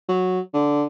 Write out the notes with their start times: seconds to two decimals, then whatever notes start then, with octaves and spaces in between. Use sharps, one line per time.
0.08 F#3
0.53 D3